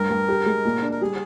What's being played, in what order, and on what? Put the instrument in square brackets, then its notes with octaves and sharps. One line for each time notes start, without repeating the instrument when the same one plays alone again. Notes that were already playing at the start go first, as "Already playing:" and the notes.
Already playing: [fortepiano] G2 [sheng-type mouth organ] A#4
[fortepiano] G2
G4
G#3
A#2
D4
[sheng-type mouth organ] A#4
[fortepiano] G3 [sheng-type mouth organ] G#4